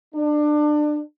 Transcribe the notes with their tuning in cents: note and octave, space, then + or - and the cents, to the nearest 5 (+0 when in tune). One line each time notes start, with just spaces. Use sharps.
D4 +25